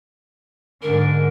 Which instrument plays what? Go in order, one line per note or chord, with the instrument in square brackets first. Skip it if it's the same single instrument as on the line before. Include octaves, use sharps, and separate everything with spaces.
[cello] G#2 D3 [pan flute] A#4